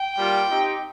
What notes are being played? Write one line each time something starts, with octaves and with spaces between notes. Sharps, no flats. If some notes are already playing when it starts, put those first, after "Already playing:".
Already playing: G5
G3 A#3 F4
C4 D#4 G4